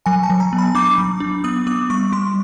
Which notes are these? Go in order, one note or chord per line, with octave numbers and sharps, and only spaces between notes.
F#3 G#5
A5
F#3
A#5
B3
B5
D4 D6
F#3
D4
B3 D#6
B3 D6
G3 C#6
G3 C6